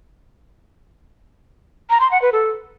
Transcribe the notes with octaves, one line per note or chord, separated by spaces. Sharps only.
A#5
C6
F#5
B4
A4